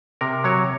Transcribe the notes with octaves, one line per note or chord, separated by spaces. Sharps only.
C3 A#4
F#3 C#5